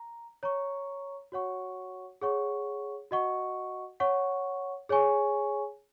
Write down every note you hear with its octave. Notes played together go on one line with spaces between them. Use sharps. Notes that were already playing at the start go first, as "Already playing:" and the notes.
Already playing: A#5
C#5 A#5 C#6
F#4 C#5 F#5 C#6
G#4 C#5 F#5 C#6
F#4 D#5 F#5 C#6
C#5 F#5 C#6
G#4 C#5 G#5 C#6